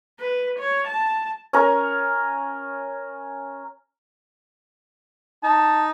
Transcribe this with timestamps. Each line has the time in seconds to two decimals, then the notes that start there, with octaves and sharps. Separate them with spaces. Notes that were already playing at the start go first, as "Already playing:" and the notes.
0.20 B4
0.59 C#5
0.88 A5
1.53 C#4 A#4
5.43 D#4 A5